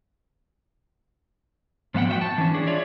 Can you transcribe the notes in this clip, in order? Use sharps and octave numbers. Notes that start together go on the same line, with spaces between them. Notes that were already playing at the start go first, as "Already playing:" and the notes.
G#2 F3 B3 E5 F#5 G5
F#4 E5 G5
A5
E3 C#4
D4 G#4
F4 C#5 D5 E5